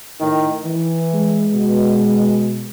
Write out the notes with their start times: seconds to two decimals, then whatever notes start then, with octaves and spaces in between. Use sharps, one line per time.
0.20 A2 D#3
0.64 E3
1.14 G#3
1.54 B2